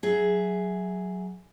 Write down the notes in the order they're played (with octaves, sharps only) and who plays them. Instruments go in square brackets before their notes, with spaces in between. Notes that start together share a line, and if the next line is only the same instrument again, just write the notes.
[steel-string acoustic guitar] F#3 G#4 E5